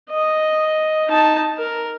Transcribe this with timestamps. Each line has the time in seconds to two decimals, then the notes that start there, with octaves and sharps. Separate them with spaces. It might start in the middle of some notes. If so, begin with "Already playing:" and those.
0.10 D#5
1.09 D#4 A5
1.57 A#4